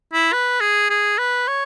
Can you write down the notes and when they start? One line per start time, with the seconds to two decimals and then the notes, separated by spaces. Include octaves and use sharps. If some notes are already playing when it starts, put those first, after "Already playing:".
0.13 E4
0.33 B4
0.61 G#4
0.90 G#4
1.18 B4
1.48 C#5